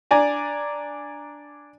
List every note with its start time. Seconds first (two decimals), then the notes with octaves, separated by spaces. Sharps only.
0.11 D4 D5 G#5 A#5